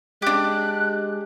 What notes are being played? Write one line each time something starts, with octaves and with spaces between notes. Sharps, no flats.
G#3 D4 G4 F#6